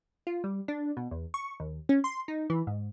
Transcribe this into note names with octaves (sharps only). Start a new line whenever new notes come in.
F4
G3
D4
B2
E2
C#6
D#2
C#4
C6
D#4
E3
G#2